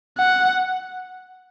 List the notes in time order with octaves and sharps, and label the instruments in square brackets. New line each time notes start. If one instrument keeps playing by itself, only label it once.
[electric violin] F#5